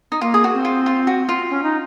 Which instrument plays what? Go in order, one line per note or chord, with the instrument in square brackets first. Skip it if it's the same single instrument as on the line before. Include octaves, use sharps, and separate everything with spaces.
[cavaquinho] D#4
[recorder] A#3 [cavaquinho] F4
[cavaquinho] G#4
F#4
[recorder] C4
[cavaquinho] F4
F4
F#4
F4
[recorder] C#4
D#4